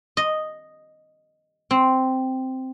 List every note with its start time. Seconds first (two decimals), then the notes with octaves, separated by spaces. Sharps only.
0.17 D#5
1.71 C4